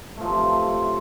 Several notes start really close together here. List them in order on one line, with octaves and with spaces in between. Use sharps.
A3 F3 F#3 C3